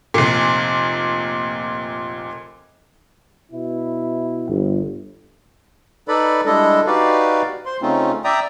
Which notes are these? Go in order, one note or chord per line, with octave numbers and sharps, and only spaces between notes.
F1 A#2
B2 E4
G1
D#4 A4 B4 D5 B5
G3 G#3 D4 E4 A4 D#5
D#4 F#4 G4 B4 D5 F5
C5 C6
C#3 A3 C4 C#4 D#4 F4
D5 E5 G5 A#5 D#6